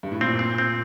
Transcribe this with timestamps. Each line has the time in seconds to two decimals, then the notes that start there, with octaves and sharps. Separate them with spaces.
0.03 G2
0.12 A2
0.21 A#2 C4
0.39 C4
0.58 C4